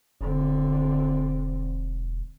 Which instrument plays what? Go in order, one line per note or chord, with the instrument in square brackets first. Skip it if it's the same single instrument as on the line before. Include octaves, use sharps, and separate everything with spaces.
[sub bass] E1 [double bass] D3 C4